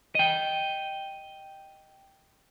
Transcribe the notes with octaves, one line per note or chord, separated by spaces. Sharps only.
D#5 G5